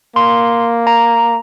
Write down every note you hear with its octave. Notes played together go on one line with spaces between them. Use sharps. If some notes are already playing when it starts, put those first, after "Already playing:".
A#3 C6
A#5